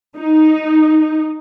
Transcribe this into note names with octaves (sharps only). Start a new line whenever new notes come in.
D#4